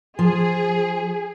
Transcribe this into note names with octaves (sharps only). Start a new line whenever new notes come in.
F3 G#4